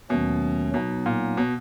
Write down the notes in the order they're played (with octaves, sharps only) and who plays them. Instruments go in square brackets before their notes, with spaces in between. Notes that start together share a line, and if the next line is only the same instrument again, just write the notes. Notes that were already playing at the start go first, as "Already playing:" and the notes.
[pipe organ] D#2 D#3 F#3 A3 C#4 [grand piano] B2
[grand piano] B2 [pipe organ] F#3 B3 D#4
[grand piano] A#2
B2